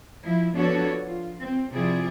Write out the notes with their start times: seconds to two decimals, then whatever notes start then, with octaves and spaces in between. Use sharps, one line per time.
0.24 F3 E4
0.54 F3 B3 D4 F#4 A4 C#5
1.07 F4
1.39 C4
1.74 C3 F3 E4 F4 G#4 D5